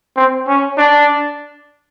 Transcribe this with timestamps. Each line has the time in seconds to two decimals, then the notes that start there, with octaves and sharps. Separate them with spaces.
0.16 C4
0.48 C#4
0.78 D4